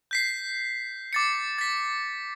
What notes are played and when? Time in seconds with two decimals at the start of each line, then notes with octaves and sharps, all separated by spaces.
0.11 G6 B6 C7
1.13 D6 A6 C#7
1.58 A6 B6